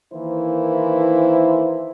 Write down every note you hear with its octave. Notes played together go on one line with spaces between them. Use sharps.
D#3 E3 A#3 E4 C5